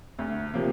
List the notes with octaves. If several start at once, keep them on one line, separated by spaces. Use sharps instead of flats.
D2
C3 F3 A#3